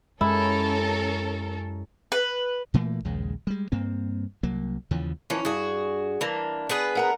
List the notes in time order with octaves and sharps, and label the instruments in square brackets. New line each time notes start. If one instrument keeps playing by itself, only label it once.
[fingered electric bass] F#2 G#3 [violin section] C#4 A4 A#4 [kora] E4
[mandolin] B4
[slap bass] A#2 E3 A3 A#3
A#1 D#2 C#3 G#3
G3 G#3
G2 A#3 C4
C2 F#3 A#3
D#2 C#3 E3 F3
[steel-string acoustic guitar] E3 F3 [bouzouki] C#4
[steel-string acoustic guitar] G2 [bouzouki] F#4 G#4
[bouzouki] E3 A#3 [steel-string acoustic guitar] D4
[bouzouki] B3 G#4 B4
[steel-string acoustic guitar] A#4 F#5 A#5